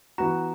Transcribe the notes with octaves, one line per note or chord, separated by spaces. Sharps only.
E3 B3 F#4 A#5